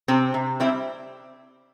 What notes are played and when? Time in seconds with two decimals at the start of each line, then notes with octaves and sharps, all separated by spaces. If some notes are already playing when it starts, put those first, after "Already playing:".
0.08 C3 C4
0.34 C3
0.60 G3 C4 E4